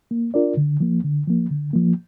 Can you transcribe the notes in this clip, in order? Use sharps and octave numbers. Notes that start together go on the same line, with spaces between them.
A#3
D4 F4 A#4 D5
D3
F3 A#3
D3
F3 A#3
D3
F3 A#3